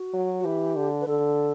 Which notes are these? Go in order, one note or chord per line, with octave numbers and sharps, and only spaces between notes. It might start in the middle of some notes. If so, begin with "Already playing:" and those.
Already playing: F#4
F#3
F#4
E3 G4
D3
B4
D3 A4